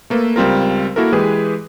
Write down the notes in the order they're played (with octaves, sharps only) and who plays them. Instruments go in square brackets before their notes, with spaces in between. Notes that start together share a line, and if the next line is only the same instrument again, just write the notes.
[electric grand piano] A3 A#3 A4 B4
C#2 G3 C4 F4 A#4
A#3 E4 F#4 A4 A#4
E3 G#3 G4 G#4 B4